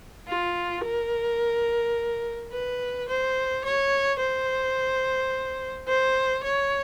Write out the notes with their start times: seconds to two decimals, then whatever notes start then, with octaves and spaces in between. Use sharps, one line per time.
0.28 F4
0.84 A#4
2.52 B4
3.09 C5
3.64 C#5
4.19 C5
5.88 C5
6.44 C#5